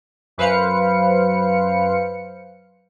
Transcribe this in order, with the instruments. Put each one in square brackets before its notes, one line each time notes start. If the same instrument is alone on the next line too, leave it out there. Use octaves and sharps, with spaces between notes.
[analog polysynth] F#2 B4 C5 F5 C#7